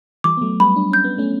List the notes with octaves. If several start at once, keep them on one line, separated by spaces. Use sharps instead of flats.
E3 G3 D6
B3
F#3 A3
G3 B3 B5
D4
C#4 G6
B3
A3 C#4